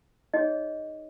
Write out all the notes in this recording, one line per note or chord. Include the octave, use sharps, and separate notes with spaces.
D#4 G#4 C#5 D#5